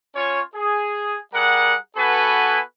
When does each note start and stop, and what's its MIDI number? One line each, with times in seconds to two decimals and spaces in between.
0.15 0.40 61
0.15 0.40 65
0.15 0.40 73
0.55 1.17 68
1.34 1.75 55
1.34 1.75 68
1.34 1.75 70
1.34 1.75 78
1.96 2.60 59
1.96 2.60 66
1.96 2.60 69
1.96 2.60 71
1.96 2.60 80